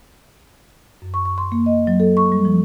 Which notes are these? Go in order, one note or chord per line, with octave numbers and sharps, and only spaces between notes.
F#2
C#6
C#6
C6
A#3
D#5
F#3
A4
C#6
G3
F3